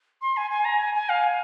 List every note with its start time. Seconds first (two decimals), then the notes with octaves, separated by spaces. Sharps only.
0.21 C6
0.37 G#5
0.51 G#5
0.65 A#5
0.80 G#5
0.94 G#5
1.09 F5
1.24 G#5